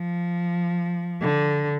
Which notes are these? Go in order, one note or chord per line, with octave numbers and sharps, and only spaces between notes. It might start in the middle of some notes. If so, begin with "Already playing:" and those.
Already playing: F3
D3